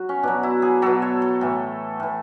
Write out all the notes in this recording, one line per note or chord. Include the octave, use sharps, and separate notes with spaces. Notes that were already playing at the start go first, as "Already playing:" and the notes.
Already playing: F#3 F#4
C#4
B2 F#3 D4
E4
G#4
B2 F#3 A4
C#5
A4
A2 E3
A2 E3